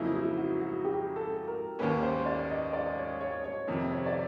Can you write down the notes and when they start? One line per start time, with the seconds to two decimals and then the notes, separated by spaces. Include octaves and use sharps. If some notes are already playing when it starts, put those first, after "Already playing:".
Already playing: F2 C#3 F#3 A#3 D#4 E4
0.14 E4
0.37 F#4
0.61 F#4
0.85 G4
1.16 A4
1.48 A#4
1.79 D#2 D#3 G3 A#3 C#4 B4
2.03 C5
2.26 D5
2.50 D#5
2.73 D5
2.97 C#5
3.21 C#5
3.44 C#5
3.67 F2 C3 D#3
3.91 C#5
4.06 D5